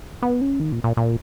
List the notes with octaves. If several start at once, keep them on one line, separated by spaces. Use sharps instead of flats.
B3
C#4
D#3
A#2
A#2
A#2